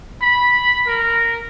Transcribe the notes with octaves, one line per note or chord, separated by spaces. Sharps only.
B5
A#4